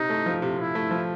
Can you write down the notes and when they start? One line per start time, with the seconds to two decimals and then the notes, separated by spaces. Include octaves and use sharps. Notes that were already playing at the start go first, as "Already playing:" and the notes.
Already playing: C3 D#4
0.10 A3
0.26 F3
0.42 C3
0.58 C3 E4
0.75 A3
0.91 F3